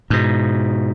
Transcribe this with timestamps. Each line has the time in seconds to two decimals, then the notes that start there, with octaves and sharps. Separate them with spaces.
0.10 G#2 B2